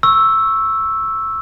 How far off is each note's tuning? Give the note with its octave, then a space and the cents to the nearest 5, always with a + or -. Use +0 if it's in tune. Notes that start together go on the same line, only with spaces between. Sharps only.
C#6 -10 E6 +0